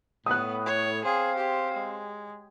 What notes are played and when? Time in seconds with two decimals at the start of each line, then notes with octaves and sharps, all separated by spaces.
0.26 A2 B3 D#6 F#6
0.66 C#5
1.05 C4 G#4 C5 F5
1.36 G4
1.74 G#3